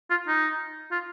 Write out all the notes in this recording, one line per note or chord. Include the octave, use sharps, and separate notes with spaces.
F4
D#4
F4